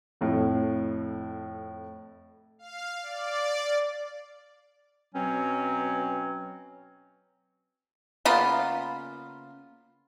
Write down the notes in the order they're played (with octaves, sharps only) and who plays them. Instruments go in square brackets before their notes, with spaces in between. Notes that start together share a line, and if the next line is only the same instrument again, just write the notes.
[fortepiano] F2 A2
[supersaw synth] F5
D5
[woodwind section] B2 F#3 C4 C#4
[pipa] C#3 A#3 B3 F4